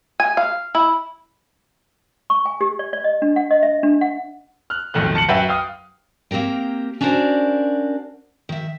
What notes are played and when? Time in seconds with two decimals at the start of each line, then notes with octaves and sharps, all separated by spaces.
0.20 G#5
0.37 F5
0.75 E4
2.30 C#6
2.46 G#5
2.61 G4
2.79 D5
2.93 D5
3.04 D#5
3.22 D4
3.36 F#5
3.51 D#5
3.63 E5
3.83 D4
4.01 F#5
4.70 F6 F#6
4.94 B1 F2 D#3 A3 F#6
5.15 A5 C#7 F#7
5.29 F#2 B4 E5 F#5 G5
5.49 F5 G5 D#6 F6
6.31 A#3 C4 G4 A#4 G5
7.01 C#4 D4 F#4 A#4 C5 D5
8.49 D#3 E5